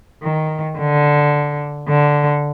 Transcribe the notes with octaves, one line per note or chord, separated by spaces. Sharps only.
D#3
D3
D3